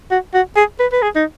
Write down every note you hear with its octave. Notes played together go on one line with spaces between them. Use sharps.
F#4
F#4
G#4
B4
B4
G#4
D#4